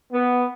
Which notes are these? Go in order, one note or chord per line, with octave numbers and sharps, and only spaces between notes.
B3